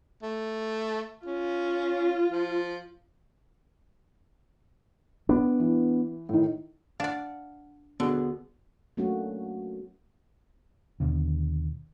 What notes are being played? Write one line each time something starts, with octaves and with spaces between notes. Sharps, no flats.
A3
C#4 F4
F3
B3 D4
E3
A2 D#3
D4 D5 F5 F#5
D3 B3 F#4 G#4
F#3 A3 A#3 C#4 D4 F#4
D#2 B2 D3